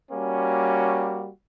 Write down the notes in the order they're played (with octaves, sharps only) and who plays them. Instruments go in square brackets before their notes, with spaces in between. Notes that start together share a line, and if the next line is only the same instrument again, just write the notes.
[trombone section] G3 A#3 F#4 [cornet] C#4